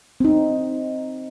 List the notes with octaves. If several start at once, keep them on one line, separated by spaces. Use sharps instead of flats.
C4 D#4